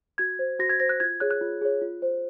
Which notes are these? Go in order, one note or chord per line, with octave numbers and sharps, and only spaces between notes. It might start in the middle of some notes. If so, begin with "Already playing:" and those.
F#4 G#6
C5
F#4 A#6
G#6
C5 A#6
F#6
F4 G#6
G#4 C#5 F#6
F#6
F4
G#4 C#5
F4
C5